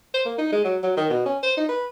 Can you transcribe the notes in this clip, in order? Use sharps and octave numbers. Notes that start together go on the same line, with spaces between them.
C5
A#3
D#4
G#3
F#3
F#3
D#3
B2
C#4
C5
D#4
B4